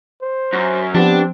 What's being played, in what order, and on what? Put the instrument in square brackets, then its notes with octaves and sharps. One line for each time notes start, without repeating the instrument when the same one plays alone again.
[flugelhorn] C5
[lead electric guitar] F#2
[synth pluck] F3 [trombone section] B3 G4 [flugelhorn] C4 [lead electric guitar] D4